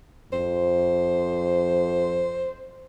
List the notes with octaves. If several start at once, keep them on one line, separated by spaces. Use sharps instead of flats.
F2 C5